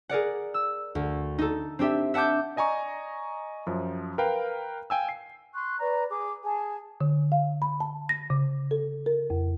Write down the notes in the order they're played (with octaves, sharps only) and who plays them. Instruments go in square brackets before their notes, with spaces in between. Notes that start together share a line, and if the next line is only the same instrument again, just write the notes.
[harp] G#4 A#4 D5 F#5
E6
D2
D#4 A4
C4 D4 G4 E5
E5 F#5 A5 D6 G6
[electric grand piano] D5 D#5 G#5 A#5 C#6
F#2 F3
A#4 B4 F5 G5
F5 G5 G#5 E6
C7
[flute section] C6 C#6 F#6
B4 D5 A#5
G#4 D6
G#4 G#5 A5
[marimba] D3
F5
B5
A5
A#6
C#3
A4
A#4
F2